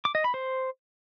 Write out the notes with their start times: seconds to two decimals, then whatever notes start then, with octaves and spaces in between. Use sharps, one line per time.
0.05 D6
0.15 D#5
0.24 B5
0.34 C5